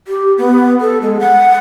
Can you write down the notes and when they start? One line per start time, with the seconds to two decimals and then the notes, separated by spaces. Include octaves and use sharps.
0.08 G4
0.38 B3
0.81 A4
1.02 G#3
1.20 F#5